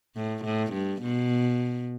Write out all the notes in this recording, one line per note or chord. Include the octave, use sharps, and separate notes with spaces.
A2
A2
G2
B2